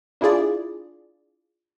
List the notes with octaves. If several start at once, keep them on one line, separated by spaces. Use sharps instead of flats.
D4 E4 F4 G#4 D5